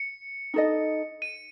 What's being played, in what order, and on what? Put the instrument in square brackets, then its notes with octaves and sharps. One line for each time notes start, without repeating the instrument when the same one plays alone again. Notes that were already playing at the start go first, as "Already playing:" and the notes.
Already playing: [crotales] C#7
[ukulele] D#4 A4 D#5
[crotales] D#7